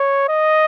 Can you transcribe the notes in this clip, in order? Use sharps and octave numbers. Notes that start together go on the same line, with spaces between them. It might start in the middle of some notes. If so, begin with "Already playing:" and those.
Already playing: C#5
D#5